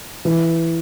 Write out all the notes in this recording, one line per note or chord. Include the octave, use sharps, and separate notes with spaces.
E3